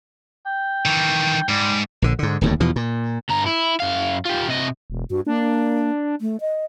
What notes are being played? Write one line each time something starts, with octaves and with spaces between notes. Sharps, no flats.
G5
D#3 E3
G#2 G3
A#1 D3
G#2 D3
D1 D#2 A2
E2 B2 F3
A#2
G2 A#5
E4
F#2 F5
F4 G4
C3 D#5
E1
G2 F#4
A#3 D4
A3
D#5